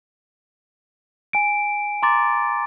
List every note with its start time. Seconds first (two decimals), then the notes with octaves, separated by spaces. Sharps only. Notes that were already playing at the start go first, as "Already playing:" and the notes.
1.33 G#5 D7
2.03 A#5 C6 D6 A6